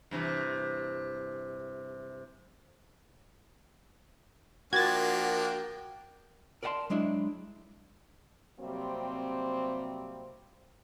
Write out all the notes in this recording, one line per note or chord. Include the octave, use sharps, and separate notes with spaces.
G2 C3 E3
F3 A#3 D4 F#4 A#4 G5 G#6 A6
A#4 D5 D#5 F#5 A5 C6
F#3 G#3 D4 E4 E5
C3 F#3 G3 A#3 C4